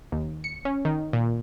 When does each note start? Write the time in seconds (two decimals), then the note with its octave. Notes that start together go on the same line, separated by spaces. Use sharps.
0.12 D#2
0.44 C#7
0.65 C#4
0.85 D#3
1.13 A#2